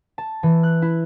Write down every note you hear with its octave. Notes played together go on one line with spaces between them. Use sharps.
A5
E3
F#6
E4